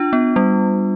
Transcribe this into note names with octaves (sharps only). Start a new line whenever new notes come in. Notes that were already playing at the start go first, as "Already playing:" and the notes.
Already playing: D4 F4
B3
G3